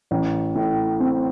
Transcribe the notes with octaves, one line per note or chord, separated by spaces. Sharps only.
A1
A2
C4